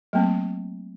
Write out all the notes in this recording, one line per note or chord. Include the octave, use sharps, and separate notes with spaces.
F#3 A3 A#3 C4